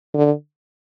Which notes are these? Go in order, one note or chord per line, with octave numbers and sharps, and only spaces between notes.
D3